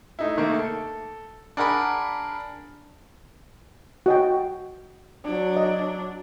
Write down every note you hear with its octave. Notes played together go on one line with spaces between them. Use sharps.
A3 D#4 E4
C3 D#3 A3 A#3
A4
D4 G#4 A#4 F#5 A#5 B5
F#4 D#5 G5
F#3 D4
D#5